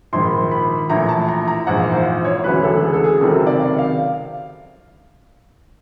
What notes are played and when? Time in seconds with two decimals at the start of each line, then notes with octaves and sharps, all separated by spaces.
0.13 A#1 G#2 D#3 C6
0.23 B5
0.32 C6
0.51 B5
0.90 A#1 A2 E3 A#5
1.09 A5
1.28 A#5
1.48 A#5
1.67 A#1 G#2 E3 F#5
1.79 F5
1.92 C5
2.25 C#5
2.43 E1 D2 C#3 E3 B4
2.63 A4
2.82 G#4
2.93 A4
3.04 G#4
3.21 C#2 C3 D#3 F#3 A4
3.47 D5
3.59 F5
3.79 F5